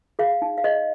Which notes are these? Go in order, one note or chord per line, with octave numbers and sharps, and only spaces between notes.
G#4 F5
D#4
F5
G#4 D#5